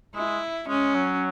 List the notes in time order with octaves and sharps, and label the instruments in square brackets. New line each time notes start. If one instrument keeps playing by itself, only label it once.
[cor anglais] G#3 [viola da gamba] E4
[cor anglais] G#3 [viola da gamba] C#4
[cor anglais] F#3